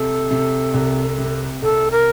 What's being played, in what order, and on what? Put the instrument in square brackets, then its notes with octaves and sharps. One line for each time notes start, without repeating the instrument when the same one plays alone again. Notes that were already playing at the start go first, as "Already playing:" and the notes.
Already playing: [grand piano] C3 [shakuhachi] A4
[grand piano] C3
C2
C3
[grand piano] C2 [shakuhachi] A4
[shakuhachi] A#4